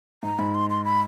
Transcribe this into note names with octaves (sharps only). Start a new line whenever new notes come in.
G#2 A#5
G#2 B5
C6
C6
B5